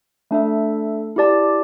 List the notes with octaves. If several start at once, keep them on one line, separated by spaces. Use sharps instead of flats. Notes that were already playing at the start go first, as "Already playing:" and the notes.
A3 D4 A4 E5
E4 G4 D5 A5